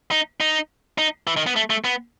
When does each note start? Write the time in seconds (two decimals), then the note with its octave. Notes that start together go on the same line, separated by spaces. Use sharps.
0.11 D#4
0.40 D#4
0.98 D#4
1.27 E3
1.37 D#3
1.47 B3
1.56 A3
1.70 A3
1.84 B3